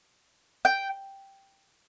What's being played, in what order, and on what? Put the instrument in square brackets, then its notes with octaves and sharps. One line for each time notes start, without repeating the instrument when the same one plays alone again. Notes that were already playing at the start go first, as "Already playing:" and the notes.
[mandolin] G5